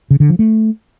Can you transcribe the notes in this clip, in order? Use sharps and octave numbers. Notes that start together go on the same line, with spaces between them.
C#3
D3
F3
A3